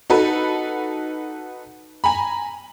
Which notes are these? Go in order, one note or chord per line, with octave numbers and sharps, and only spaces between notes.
D#4 F#4 A4 B4
G#5 A#5 B5